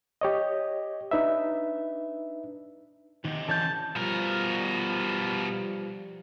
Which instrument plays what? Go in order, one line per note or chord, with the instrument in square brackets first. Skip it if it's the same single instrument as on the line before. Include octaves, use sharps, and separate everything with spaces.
[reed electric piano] G4 C#5 D#5
D4 D#4 B4 E5
[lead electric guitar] G#2 C3 [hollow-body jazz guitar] D#3
[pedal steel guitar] D3 C#4 G6 [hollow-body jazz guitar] E3 C#5 [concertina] A5
[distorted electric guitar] B2 A#4 [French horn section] F3 G3